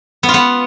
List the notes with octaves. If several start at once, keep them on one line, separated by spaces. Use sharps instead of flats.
B3
F4
B3